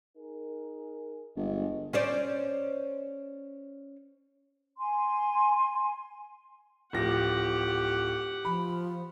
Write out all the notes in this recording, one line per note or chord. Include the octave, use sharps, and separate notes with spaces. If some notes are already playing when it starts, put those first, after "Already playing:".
D#4 G#4 A#4
G1 G#3 D#5
C#4 C5 D5
G#5 C6
D1 F3 G4 F#5 A#6
F3 B5